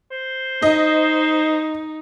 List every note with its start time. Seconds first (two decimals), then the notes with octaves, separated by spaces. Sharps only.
0.11 C5
0.62 D#4 D#5